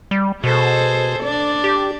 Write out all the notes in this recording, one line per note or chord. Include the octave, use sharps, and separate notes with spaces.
G3
B2 G#4 A4 C5
D4 D5
G4